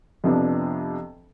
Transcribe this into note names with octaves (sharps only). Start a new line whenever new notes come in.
F2 C3 F3 B3 D4